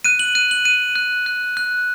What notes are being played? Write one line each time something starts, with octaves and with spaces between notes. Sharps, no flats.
F#6 D#7
F#7
F#6 D#7
F#7
F#6 D#7
F#6
F#6
F#6